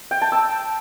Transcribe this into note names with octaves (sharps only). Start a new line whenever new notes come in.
G5
A5
E6